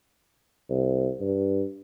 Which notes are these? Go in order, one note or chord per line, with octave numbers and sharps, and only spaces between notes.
C2
G2